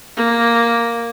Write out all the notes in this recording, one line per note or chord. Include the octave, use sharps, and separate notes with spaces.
A#3